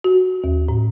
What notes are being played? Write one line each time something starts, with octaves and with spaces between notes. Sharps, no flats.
F#4
D#2
A2